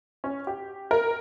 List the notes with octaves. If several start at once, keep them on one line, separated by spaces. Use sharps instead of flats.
C#4
G4
A#4